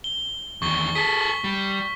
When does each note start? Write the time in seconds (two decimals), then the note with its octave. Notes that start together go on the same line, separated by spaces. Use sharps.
0.04 G7
0.62 E2 D#3 C#6 G7
0.95 G#4 A4 B6
1.21 C#6
1.44 G3